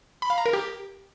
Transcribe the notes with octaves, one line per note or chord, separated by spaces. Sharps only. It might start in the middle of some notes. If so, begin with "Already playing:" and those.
B5
F5
A#5
A#4
G4